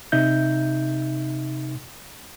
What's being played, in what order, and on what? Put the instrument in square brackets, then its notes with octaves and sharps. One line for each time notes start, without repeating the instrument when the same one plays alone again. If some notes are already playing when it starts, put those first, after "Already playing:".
[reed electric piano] C3 D#4 E5 G6